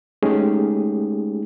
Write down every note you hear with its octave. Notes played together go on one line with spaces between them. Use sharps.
G#3 A3 C#4 D#4 G4 G#4